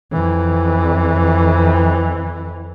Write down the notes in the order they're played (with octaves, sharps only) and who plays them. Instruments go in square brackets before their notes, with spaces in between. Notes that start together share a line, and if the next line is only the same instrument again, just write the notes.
[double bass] F2 E3